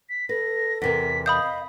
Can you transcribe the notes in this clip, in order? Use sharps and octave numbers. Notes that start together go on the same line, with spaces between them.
B6
A4 B4 A#6
E2 C3 A#4 B6
D#5 F5 B5 D#6 G6